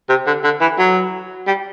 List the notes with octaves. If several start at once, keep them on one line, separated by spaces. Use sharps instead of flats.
C3
D3
D3
E3
F#3
G3